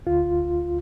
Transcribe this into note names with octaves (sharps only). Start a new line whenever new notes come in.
D2 F4